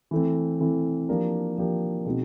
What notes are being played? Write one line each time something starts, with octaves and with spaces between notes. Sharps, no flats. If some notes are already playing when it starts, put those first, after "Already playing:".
E3 A3 C4
E3 A3 C4
F3 A#3 D4 G4 A#4
F3 A#3 D4 G4 A#4
B2 G#3 C4 D#4 F#4